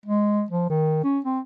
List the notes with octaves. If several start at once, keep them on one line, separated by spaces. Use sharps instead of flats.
G#3
F3
D#3
C#4
C4